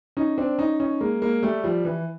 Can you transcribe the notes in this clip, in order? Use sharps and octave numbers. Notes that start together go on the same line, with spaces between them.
C#4 D#4
C4 D4
C#4 D#4
C#4 D#4
G#3 A#3
G#3 A#3
G3 A3
F3 G3
E3